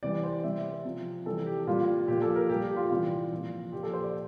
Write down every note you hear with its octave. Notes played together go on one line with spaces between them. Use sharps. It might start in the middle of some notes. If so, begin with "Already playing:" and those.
C3 E3 G3 D5
C5
C3 G3 E5
C5
C3 F3
C3 E3 G3 A4
G4
A#2 G3 F4
A#2 F3 G4
A4
A#4
A#2 G3 G4
G4
F4
C3 E3 G3 F4
A#2 F3
A#2 F3 G4
A4
C5
D5